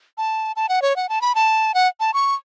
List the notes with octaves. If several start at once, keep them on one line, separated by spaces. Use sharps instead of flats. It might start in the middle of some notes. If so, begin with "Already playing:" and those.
A5
A5
F#5
C#5
F#5
A5
B5
A5
F#5
A5
C#6